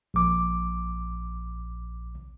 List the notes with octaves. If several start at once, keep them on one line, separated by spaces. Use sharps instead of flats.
A#1 D6